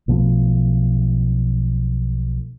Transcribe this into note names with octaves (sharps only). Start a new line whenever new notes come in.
B1 B2 F3 A3